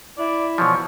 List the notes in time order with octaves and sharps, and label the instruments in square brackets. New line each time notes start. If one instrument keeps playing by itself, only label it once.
[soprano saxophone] E4 [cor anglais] D5
[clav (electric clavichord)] B2 E3 F3 [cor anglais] C#5